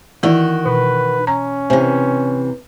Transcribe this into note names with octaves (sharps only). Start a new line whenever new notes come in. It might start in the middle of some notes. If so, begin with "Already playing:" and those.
D#3 E3 E4 F#4 D5
B2 B4
C#4 A#5
C3 E3 C5 E5 G#5